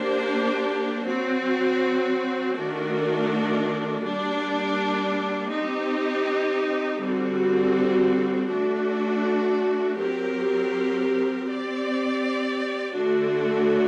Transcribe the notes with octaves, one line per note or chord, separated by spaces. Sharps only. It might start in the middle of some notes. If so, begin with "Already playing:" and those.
Already playing: A#3 D4 G4 C5
F#3 C4 F#4
D#3 A3 D4 F#4 A#4
G3 A#3 D4
C4 D#4 G4
D3 G3 C4 F#4
A3 D4 F#4
F#3 C4 G4 A#4
C4 G4 D5
D3 A3 D4 F#4